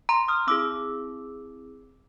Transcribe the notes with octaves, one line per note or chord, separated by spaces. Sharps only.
A#5 C6
D#6 F6
C4 E4 G#4 D6 E6